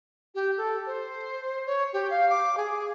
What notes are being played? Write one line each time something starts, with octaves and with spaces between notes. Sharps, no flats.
G4
A4
C5
C#5
G4
F5
D6
G#4